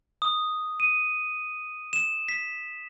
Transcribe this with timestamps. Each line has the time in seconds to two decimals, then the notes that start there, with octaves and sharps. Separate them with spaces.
0.22 D#6
0.80 D#7
1.93 E7
2.29 B6